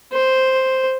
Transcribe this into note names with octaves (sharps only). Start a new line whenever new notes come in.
C5